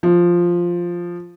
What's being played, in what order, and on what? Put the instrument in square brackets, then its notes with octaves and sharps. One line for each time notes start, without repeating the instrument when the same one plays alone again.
[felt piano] F3